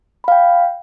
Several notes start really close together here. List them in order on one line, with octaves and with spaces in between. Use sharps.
B5 F5 G5